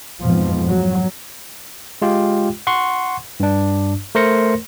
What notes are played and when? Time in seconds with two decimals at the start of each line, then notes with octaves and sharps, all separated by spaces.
0.23 F2 G#2 B2 F3
0.68 F#3
2.02 G#3 F4 G4 G5
2.67 F#5 C6 C#6
3.40 G2 D4
4.15 A3 A#4 C5 C6 A#6 C#7